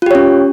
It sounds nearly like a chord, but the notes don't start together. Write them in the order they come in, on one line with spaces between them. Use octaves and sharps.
F4 G4 C#5 C#4